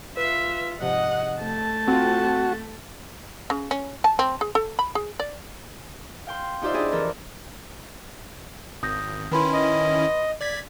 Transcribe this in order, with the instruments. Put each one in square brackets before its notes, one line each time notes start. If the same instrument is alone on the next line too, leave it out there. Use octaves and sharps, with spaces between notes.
[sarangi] F4 [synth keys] B4 C7 [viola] E5
[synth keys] G#2 C3 F3 [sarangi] D#5 [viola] F#5
[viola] A3 [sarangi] A5
[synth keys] C4 F4 [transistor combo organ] F#4
[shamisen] C#3
C#4
A5
C4
G#4
A4
B5
G#4
D5
[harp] F5 G5 C6
D#4 F4 G4 C5 D5 E5
D4 E4 G#4 D5 D#5
F2 E3 A4 A#4
[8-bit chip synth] G#1 [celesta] D#6 G6 A#6
[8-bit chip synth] D#3 C#4 E4 [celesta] B4 B5 C6
[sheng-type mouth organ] D#5
[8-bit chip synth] D5 G#6 B6